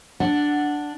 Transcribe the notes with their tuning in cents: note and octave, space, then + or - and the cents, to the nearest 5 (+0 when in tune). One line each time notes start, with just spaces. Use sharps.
D4 +0 F#5 +0